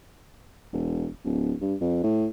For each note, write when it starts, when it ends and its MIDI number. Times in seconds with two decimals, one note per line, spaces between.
0.73 1.08 28
1.24 1.54 26
1.61 1.75 43
1.81 2.03 41
2.03 2.27 45